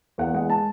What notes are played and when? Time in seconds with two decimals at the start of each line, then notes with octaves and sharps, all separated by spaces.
0.18 E2 F#5
0.34 G#3 F#5
0.50 A5